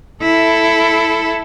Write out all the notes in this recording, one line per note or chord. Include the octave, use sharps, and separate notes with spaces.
E4 A4